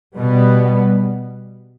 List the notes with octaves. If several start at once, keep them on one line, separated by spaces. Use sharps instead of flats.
B2 G3 B3